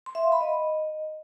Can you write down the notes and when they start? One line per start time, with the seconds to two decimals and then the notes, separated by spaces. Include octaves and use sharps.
0.06 C6
0.15 E5
0.24 F5
0.32 B5
0.41 D#5